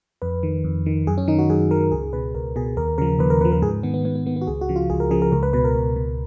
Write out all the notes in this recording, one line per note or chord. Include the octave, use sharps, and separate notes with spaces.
F2 B4
D#3
F2
D#3
F#2 G#4
C#4
D#3 D#4
F#4
F#2 G#4
D#3 A#4
C#2 G#4
B2 B4
C#2 A#4
B2 G#4
D#2 A#4
C#3 F3 A#4
D#2 B4
A#4
C#3 F3 B4
A#4
G#2 G#4
D#3 B3
B3
G#2 B3
B3
D#3 B3
B3
F#4
C#2 G#4
F#4
C#3 F3
F4
C#2 G#4
A#4
C#3 F3 G#4
A#4
C#2 A#4
B4
B2 B4
A#4
C#2
B2